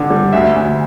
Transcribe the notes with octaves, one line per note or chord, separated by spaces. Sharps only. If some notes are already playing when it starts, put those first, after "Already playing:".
Already playing: G2 D3
G3
D2 E5
D2